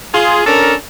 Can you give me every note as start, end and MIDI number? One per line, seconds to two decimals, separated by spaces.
0.14 0.42 65
0.14 0.42 68
0.46 0.74 61
0.46 0.74 62
0.46 0.74 69
0.46 0.74 70